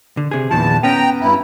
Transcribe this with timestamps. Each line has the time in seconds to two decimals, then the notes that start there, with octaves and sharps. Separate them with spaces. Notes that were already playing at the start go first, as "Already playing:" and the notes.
0.17 D3
0.31 C3 G#4
0.51 E2 A#2 D#3 F3 A5
0.83 B3 C#4 G5 A#5
1.21 G2 E4